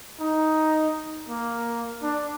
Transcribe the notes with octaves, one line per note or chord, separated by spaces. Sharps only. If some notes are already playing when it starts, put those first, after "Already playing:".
D#4
A#3
D4